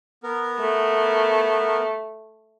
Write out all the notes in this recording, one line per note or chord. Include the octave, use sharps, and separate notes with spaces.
B3 A#4
A3